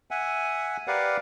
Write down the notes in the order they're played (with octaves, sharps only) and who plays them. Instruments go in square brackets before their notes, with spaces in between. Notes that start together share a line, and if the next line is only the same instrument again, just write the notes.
[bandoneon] E5 F#5 G#5
G4 A#4 B4 D5 F5 F#5